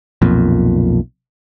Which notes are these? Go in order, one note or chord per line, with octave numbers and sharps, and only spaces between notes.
B1 F2 A#2